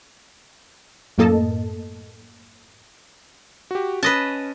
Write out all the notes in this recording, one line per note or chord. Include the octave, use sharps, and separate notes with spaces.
F#2 A2 A#3 A4 D#5 A5
F#4 G4
C#4 B4 D#5 A5